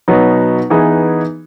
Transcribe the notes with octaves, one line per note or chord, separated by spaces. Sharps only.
B2 F#3 B3 D#4
E3 B3 D#4 G#4